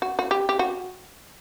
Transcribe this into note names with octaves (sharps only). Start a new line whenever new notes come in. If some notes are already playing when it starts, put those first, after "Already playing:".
F#4
F#4
G4
G4
F#4